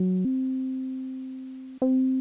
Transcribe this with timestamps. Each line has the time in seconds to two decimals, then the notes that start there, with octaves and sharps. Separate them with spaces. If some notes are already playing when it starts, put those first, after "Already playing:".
Already playing: F#3
0.25 C4
1.82 C4